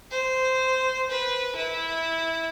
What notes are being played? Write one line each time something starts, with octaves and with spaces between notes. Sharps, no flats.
C5
B4
E4